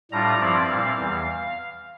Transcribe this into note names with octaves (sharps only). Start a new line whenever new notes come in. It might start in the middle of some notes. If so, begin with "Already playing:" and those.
A2 G3 D4 F4 A#5
G2 F3 C4 E4 D5
A#2 G3 C4 E4 F5
E2 E3 G3